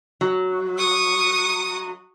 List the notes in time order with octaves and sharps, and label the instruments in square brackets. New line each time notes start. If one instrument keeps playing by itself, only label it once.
[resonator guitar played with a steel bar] F#3
[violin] C#6 D#6